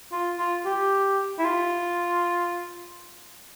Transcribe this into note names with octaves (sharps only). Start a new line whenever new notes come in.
F4
F4
G4
E4
F4